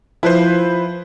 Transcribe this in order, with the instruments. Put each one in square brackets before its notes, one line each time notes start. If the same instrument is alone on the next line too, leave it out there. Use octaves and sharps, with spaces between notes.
[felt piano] F3 [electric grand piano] E4 B4 C5